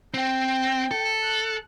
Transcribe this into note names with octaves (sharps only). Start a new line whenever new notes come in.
C4 G5
A4
F#6